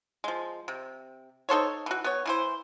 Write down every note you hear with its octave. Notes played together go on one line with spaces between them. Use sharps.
F3 G#3
C3
D#4 A4 C5 C#5
E3 F#4
B3 C#5
E3 E4 C5